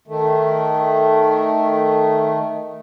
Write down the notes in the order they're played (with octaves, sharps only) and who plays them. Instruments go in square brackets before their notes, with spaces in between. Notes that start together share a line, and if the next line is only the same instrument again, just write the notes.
[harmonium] D#3 A3